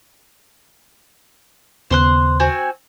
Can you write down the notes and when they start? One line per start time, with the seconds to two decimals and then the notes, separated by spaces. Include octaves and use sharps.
1.90 D#2 C#3 B3 C5 C6 F#6
2.40 C4 F#4 G#5